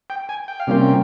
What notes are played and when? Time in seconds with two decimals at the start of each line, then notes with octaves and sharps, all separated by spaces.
0.10 G5
0.29 G#5
0.48 G5
0.60 F5
0.67 C3 G3 A#3 C#4 F4 G5